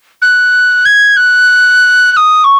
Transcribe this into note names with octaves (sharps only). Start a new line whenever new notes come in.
F#6
G#6
F#6
F#6
D#6
C#6